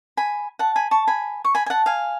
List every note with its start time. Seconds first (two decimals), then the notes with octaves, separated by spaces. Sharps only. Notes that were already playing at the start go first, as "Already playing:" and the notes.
0.17 G#5 B5
0.59 F#5 A5
0.76 G#5 B5
0.91 A5 C#6
1.08 G#5 B5
1.45 C#6
1.55 G#5 B5
1.66 G#5
1.70 F#5 A5
1.86 F5 G#5